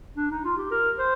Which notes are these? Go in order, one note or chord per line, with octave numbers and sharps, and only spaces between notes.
D4
D#4
F4
G4
A#4
C5